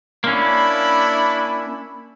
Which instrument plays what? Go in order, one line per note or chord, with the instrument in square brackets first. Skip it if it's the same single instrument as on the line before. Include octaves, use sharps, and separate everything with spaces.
[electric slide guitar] A#3 C#4 [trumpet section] D4 E4 B5